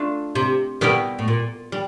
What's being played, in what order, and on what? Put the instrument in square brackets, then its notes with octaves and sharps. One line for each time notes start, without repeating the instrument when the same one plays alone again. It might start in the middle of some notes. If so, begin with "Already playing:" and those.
Already playing: [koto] A3 D4 F4 A4
[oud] C3
[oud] B2 [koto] G3 B3 E4 G4 A#4
[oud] A2
A#2
[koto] G3